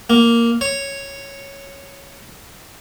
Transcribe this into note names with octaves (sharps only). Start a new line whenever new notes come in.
A#3
C#5